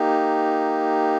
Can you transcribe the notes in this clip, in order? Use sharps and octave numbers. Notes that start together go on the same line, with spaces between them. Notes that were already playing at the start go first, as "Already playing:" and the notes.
Already playing: A#3 D#4 G4